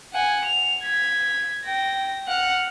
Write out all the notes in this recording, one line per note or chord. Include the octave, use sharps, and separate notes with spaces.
F#5 G#5
F7
G#6 B6
G5 A#6
F#5 F6